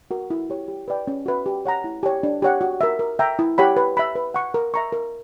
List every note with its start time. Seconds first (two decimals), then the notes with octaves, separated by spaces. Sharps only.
0.11 F#4 A#4
0.30 E4
0.50 G4 C#5
0.68 G4
0.88 B4 D5 G5
1.07 C#4
1.26 F#4 B4 E5
1.46 G4
1.66 C#5 F#5 A#5
1.84 E4
2.03 G4 C#5
2.23 D4
2.42 G4 C#5 F#5
2.61 F#4
2.81 A#4 E5
2.99 A#4
3.19 E5 G5 A#5
3.39 E4
3.58 G4 C#5 F#5 B5
3.77 B4
3.97 E5 B5
4.15 B4
4.34 F#5 C#6
4.54 A#4
4.74 E5 A#5 C#6
4.92 A#4